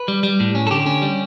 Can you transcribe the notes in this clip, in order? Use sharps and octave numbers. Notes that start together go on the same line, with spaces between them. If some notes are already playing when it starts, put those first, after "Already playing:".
Already playing: B4
G3
G3
A2
C#4
A4
D3 G4
C#4
G3